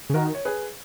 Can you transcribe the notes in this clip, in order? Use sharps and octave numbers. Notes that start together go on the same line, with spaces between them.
C#3
D#3 F#4 A#4
C#5
G#4 B4